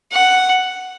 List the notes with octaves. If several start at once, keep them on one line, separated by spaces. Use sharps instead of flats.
F#5